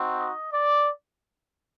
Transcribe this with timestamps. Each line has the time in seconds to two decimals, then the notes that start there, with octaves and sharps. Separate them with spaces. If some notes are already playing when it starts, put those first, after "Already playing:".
Already playing: C4 D#4 F#4
0.16 D#5
0.52 D5